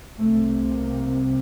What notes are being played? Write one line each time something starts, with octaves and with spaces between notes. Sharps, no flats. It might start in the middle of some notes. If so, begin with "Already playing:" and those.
C2 C3 A3
A#3